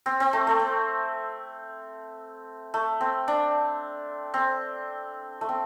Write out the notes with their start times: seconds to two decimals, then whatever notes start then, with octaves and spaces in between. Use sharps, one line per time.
0.06 C4
0.20 C4
0.33 A3
0.47 A3
0.59 C4
2.74 A3
3.01 C4
3.28 D4
4.34 C4
5.41 A3
5.49 C4